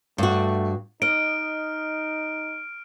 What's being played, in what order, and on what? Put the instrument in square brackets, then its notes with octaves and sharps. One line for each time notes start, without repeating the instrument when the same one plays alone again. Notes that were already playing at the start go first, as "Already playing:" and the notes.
[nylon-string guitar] G2 F#4 [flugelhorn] A3
[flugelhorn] D#4 [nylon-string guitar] D#5 [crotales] F6 D7